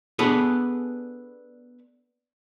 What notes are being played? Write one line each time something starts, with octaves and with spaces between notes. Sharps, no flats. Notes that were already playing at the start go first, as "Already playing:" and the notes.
B3 D4 G#4 A4 B4